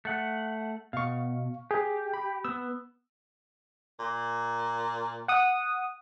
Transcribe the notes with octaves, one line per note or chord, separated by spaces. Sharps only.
A3 F#5
B2 F5 C#6
G4 G#4
B5
B3 E6
A#2
F#5 D#6